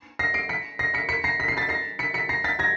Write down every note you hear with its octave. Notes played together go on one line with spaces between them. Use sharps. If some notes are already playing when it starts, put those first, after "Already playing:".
A#6 C7
C7 D7
B6 C#7
A#6 C7
B6 C#7
B6 C#7
A#6 C7
B6
C7
A6 B6
A#6 C7
B6 C#7
B6 C#7
A#6 C7
A6 B6
G#6 A#6